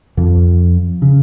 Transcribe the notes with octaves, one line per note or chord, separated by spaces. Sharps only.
F2 F3
C#3